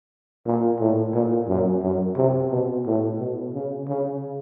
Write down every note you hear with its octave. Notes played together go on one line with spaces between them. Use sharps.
A#2
A2
A#2
F#2
F#2
C3
B2
A2
B2
C#3
C#3